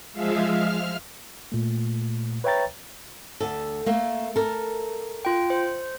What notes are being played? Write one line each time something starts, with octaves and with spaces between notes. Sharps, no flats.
F3 G#3 E5 F5
F6
A#2 A3
B4 C#5 E5 G5 A#5 A6
D2 A4
A3 A#3
A4 A#4
F4 G5
C5